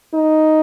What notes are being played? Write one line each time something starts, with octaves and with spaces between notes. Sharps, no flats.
D#4